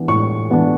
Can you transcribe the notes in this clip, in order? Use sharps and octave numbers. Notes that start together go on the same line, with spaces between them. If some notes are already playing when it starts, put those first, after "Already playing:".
Already playing: E3 B3 D4
A2 C#6
E3 B3 D4